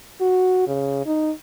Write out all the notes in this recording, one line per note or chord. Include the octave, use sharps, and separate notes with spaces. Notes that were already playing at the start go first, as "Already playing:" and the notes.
F#4
C#3
D#4